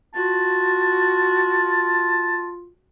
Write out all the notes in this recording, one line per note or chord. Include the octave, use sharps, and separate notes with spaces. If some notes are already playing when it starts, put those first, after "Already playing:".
F4 F#4 A5